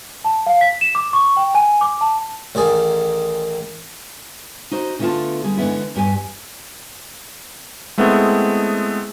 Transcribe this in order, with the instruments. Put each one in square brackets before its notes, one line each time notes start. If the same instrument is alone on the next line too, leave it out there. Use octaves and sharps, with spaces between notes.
[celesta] A5
F5
B6
E7
D6
C#6
G5
G#5
D6
A5
[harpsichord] A1 D#3 G#4 D5
[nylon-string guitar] D#4 F#4 C5
D3 A3 B3 E4 F4 A5
D3 G3 G#4
D3 E3 G#3 B3 E4
E2 G2 G4 G#5
[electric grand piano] G#3 A3 B3 C4 E4 G#4